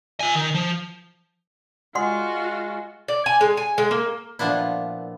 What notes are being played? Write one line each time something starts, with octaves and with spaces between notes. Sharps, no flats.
F4 G#5
D#3
F3
G#3 F4 F#4 F#5 C6
D5
G#5
G#3
G#5
G#3
A#3
A#2 F3 B3 D4 E4